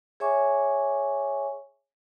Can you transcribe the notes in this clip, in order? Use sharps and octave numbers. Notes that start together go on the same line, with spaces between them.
G#4 C#5 E5 G#5 C#6 D6